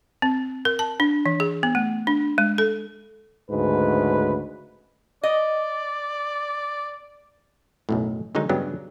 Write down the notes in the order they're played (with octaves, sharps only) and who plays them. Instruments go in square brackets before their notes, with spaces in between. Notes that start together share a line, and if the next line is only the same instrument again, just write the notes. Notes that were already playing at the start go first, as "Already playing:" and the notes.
[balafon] C4
A#4
A5
D4
E3
G#4
B3
A3
D4
G#3
A4
[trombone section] D2 G#2 C#3 B4
[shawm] D5 [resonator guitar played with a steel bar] D#5
[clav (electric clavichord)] B1 F#2 A2
D3 D#3 F#3 G#3 D#4
G2 C#3 F#3 B3 D4 G4